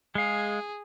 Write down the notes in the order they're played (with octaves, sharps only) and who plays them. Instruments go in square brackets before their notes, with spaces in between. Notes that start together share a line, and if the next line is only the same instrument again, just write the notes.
[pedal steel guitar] G#3 F5 [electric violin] G#4